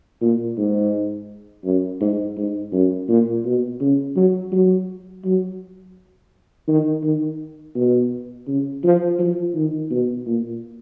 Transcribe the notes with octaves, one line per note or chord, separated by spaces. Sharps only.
A#2
G#2
F#2
G#2
G#2
F#2
A#2
B2
C#3
F#3
F#3
F#3
D#3
D#3
B2
C#3
F3
F3
D#3
B2
A#2